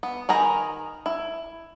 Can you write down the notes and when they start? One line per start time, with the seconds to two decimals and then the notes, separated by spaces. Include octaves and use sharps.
0.03 B3
0.29 D#3 G#4 A#5 B5
1.06 E4